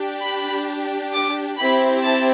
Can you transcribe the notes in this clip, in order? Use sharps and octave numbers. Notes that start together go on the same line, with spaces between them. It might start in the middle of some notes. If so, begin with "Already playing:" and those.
Already playing: D4 G4
B5
D6
C4 E4 G4 B5
A5